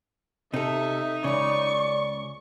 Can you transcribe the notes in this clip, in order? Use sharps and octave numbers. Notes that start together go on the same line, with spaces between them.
C3 D#4 A4 E5
C#2 C#3 D5 C#6